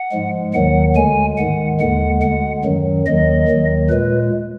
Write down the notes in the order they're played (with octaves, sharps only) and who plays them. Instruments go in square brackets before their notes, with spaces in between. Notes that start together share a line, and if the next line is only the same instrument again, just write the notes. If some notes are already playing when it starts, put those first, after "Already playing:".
Already playing: [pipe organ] F#5
G#2 F3 G#3
D#2 D#3 F#3 F#5
D2 D3 G#3 G#5
G#2 D#3 G#3 F#5
D#2 D3 G#3 F#5
D2 D3 G#3 F#5
F#2 D#3 F#3
D#2 D#3 F#3 D#5
D#2 D#3 F#3
A#2 G#3 B4